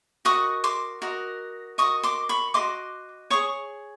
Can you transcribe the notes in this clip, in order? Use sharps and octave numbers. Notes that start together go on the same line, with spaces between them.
F#4 A#4 D#5 C#6 D#6
C6 D6
F#4 A#4 D#5
F#4 A#4 D#5 C#6 D#6
C6 D6
B5 C#6
F#4 A#4 D#5 C6 D6
G#4 C#5 C#6 D#6